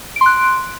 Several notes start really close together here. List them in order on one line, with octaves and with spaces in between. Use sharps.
D7 C6 F#6